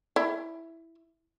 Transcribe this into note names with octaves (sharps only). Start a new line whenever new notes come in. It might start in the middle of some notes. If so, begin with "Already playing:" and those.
E4 E5